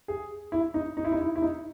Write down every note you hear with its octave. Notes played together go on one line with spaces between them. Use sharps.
G#4
E4
D#4
D#4
E4
D#4
E4
E4
D#4